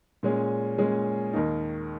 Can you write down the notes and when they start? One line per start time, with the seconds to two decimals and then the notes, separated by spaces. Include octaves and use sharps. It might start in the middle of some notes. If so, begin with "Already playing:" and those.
0.23 A#2 G#3 C#4 G#4
0.78 A#2 G#3 C#4 G#4
1.33 D#2 D#3 A#3 D#4